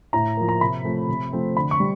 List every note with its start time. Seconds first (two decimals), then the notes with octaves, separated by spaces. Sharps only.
0.13 A2 A#5
0.37 F3 A#3
0.49 A#5
0.60 C3 B5
0.84 F3 A3 C4
1.09 C3
1.33 F3 A3 C4
1.56 D3 B5
1.71 C#6
1.80 G3